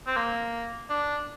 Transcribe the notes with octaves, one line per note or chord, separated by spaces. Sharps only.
C4
A#3
D4